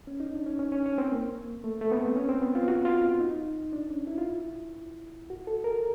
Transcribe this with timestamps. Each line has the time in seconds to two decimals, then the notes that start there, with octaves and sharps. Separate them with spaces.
0.07 C#4
0.20 D#4
0.34 D4
0.46 C#4
0.59 C#4
0.72 C#4
0.86 C#4
0.98 C4
1.12 A#3
1.64 A3
1.81 A3
1.91 B3
1.99 C4
2.16 C#4
2.29 C4
2.42 B3
2.55 F4
2.68 F#4
2.85 F4
3.20 D#4
3.73 D4
3.90 C#4
4.07 E4
4.18 F4
4.29 E4
5.30 F#4
5.47 A4
5.64 A#4